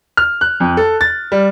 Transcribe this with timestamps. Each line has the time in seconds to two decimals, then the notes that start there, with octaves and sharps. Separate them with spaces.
0.17 F6
0.41 F#6
0.60 F2
0.77 A4
1.01 A6
1.32 G3